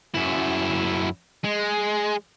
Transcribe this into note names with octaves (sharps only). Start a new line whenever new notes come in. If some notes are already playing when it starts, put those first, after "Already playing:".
F#2 E4
G#3